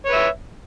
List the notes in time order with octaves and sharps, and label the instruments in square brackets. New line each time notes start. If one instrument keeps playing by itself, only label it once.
[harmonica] C#5
B4
E5